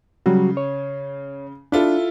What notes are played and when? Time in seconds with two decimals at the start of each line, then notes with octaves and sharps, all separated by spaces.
0.26 C#3 F#3 G3 F#4
0.57 C#5
1.72 D4 E4 F4 A4